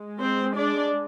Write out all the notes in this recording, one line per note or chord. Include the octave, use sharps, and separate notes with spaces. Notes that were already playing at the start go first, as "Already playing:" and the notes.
Already playing: G#3
C4 C5
D4 D5